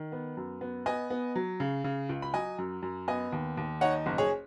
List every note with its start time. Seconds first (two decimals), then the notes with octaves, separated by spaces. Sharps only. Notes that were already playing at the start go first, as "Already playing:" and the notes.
Already playing: D#3
0.12 B3
0.37 F#2
0.61 B3
0.86 B3 D#5 G#5
1.10 B3
1.36 F#3
1.60 C#3
1.84 C#3
2.09 C#2
2.22 B5
2.34 F#3 D#5 G#5
2.58 F#2
2.82 F#2
3.08 B3 D#5 G#5
3.32 D#2
3.57 D#2
3.81 D#4 C#5 F#5
4.06 F#1
4.18 G#4 C#5